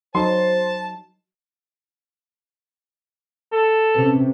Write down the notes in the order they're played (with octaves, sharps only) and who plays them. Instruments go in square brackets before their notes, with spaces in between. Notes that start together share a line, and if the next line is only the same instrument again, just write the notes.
[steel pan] F#3 D#4 [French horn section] C5 [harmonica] A5 [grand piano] C6
[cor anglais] A4
[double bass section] C3 [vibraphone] C#4 B4